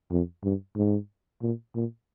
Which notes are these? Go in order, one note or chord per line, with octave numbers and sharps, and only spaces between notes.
F2
G2
G#2
A#2
A#2